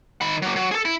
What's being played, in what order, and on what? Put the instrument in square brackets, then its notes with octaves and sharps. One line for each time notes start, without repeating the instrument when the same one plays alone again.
[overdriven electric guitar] D#3 B5
F#3 A#3
F#3
G#4 A4
E4